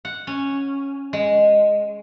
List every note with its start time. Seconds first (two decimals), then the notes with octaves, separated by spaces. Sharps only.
0.05 F#5
0.27 C#4
1.13 G#3